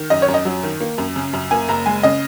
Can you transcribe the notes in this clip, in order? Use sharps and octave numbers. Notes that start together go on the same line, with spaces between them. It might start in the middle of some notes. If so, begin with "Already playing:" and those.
Already playing: D#3
F#2 D#5
C#5
F#2
D#5
F#3
D#3
A#3
F#2
C#3
F#2
A#3 G#5
F#1 A#5
G#3 G#5
C#3 D#5